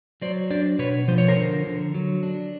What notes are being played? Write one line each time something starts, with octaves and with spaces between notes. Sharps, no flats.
F#3 C5 D5
D4 C5 D5
B2 B4 C#5
F3 C5
C#5
A#4 C5
D3
D3
F#3
D4